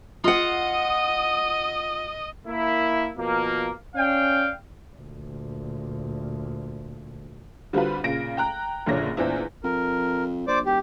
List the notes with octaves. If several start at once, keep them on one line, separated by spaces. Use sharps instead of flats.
F4 D#5 F#5 D#6
A#3 E4
B2 F3 A#3
C#4 D5 F5 G5
D2 A#2
D3 G3 C4 F4 F#4 B4
A#2 C#3 A#6 D7
G5 A#5 F#6
F#1 A#2 D3 D4 C#5 A#6
E2 A#2 E3 C4 D4 E4
F2 A#4
A#1 C5 D5 D6
E1 G4